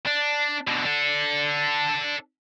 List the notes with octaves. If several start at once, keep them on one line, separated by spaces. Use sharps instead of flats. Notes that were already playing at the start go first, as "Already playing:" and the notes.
D4
B2 D3
D4 A4